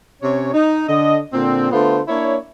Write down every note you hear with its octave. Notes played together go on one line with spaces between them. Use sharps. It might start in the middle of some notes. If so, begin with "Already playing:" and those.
C3 C#4 C#5
D#4
D3 D#5
A#2 D3 C4
D3 A3 B3 F4 C5
A#3 D4 E4 C#5